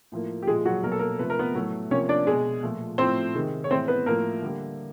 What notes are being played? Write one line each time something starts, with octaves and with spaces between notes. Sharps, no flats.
A2 F3 A#3
G4
A#2 F3 G#3 G#4
F#3 F#4
B2 F#3 A#3 A#4
A4
A#3 A#4
C3 F3 A3 B4
A#4
B3 B4
A2 F#3 A3
C3 F3 A#3 C#4 C#5
D4 D5
B2 G#3 G#4
A#2 F3 A3
A2 F3 A3 C4 C5
C3 D#3 G#3
C#5
A2 E3 G#3 C4 C5
B3 B4
A2 F3 A3 A#3 A#4
D3 G3 A#3